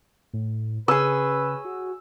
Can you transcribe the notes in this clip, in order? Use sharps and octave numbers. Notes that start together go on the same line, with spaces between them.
A2
C#3 C#4 G#4 B4 E6
F#4